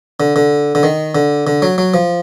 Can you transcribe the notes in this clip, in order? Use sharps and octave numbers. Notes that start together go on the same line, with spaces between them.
D3
D3
D3
D#3
D3
D3
F#3
F#3
F3